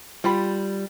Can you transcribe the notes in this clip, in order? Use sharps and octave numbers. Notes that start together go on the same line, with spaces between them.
G3 F4 G5 B5